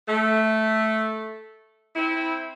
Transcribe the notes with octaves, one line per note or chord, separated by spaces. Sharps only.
A3
C4 E4